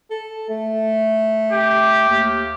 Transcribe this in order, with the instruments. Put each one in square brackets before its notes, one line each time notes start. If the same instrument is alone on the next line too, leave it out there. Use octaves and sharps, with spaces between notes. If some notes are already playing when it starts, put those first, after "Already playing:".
[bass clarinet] A4
A3
[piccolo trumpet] G4
[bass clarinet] D#2